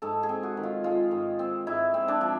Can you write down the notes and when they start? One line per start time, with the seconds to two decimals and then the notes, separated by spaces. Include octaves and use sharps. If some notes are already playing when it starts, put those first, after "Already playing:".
0.02 G#2 A4
0.23 G#4
0.29 C4
0.43 F#4
0.57 D#3
0.63 F4
0.84 G#3 F4
1.11 G#2
1.39 C4
1.67 G#2 E4
1.94 C4
2.08 D4
2.21 F3